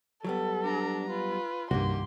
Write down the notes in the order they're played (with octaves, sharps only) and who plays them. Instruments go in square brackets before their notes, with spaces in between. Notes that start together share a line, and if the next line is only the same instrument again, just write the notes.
[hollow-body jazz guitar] F#3 G3 B3 [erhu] A4
[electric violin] D4 A#5
[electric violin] F4 [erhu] B4
[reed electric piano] C2 G2 [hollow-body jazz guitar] D#3 F#4 [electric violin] A#3 G4 [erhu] C6